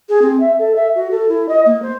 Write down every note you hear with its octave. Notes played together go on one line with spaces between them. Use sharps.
G#4
C4
E5
A4
E5
F#4
A4
E4
D#5
A#3
C5